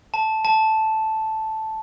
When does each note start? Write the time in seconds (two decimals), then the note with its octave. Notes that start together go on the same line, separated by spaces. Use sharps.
0.14 A5
0.45 A5